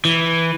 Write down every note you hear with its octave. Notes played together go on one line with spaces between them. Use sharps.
E3